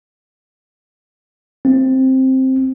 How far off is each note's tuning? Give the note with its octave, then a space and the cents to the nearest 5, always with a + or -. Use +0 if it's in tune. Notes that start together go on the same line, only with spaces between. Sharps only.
C4 +5